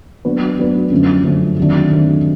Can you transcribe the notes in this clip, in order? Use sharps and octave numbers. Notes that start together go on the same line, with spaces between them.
F#3 B3 D4 F#4 B4
F#3 B3 D4 F#4 B4
F#2 D3 F3 A3 C#4
F#2 D3 F3 A3 C#4
C3 D#3 F#3 A3 D4
C3 D#3 F#3 A3 D4